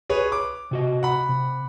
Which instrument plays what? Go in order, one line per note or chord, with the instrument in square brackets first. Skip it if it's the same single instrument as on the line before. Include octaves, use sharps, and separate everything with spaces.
[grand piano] G#4 B4 C#5
D6
[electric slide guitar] C3 F#4 D#5
[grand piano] F#5 B5
[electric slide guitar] C3